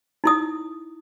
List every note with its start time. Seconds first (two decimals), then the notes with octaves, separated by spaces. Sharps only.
0.24 D#4 E4 D#6